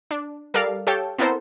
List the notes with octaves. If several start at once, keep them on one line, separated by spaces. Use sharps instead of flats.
D4
G3 A4 A#4 D5 F5
G4 A4 C#5 F5 G5 A5
B3 C4 E4 A4 A#4 C5